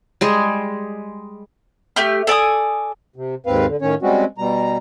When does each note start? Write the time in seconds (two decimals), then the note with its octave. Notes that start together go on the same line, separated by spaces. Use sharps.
0.21 G3 G#3 G#4
1.96 A3 G4 F6
2.27 A4 D5 G#5 D#6
3.16 C3
3.46 D#2 G#2 C4 B4 F5
3.67 D3
3.82 A2 D#3 C#4 C#5
4.02 G3 G#3 C4 C#4 F#4
4.38 B2 G3 A#5